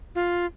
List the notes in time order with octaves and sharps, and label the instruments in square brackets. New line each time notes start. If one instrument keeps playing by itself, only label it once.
[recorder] F4